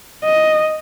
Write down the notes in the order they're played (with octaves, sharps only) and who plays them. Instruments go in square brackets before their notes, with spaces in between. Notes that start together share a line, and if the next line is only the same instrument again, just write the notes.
[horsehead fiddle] D#5